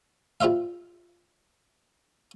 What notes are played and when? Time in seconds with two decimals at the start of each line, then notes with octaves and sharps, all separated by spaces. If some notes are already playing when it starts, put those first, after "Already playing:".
0.41 G3 F4 C5 E5 F5